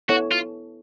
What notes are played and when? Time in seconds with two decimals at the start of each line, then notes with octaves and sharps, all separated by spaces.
0.09 B3 E4 F#4 A4 C#5 E5
0.31 F4